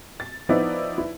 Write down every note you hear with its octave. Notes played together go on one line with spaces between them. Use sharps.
A6
F3 B3 D#4 E4 B4 D5
E4